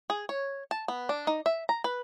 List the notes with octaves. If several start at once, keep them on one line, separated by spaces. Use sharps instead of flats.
G#4
C#5
A5
B3
D4
D#4
E5
A#5
B4